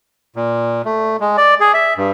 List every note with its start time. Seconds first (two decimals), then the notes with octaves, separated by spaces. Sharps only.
0.36 A#2
0.85 A3
1.20 G#3
1.37 D5
1.60 G#4
1.74 E5
1.97 G2